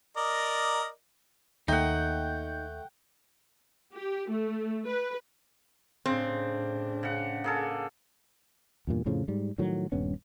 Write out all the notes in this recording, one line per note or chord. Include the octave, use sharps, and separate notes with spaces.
A#4 D5 D#5
D#2 A3 A#3 D#4 F#5 G5
G4
A3
B4
A2 C#3 C4 D4
C#3 F#5
A#3 G#4 A4
E2 G2 A#2
F2 A2 C#3 F3
G#2 G3
A2 D#3 F3 F#3
D#1 G2 B3 C#4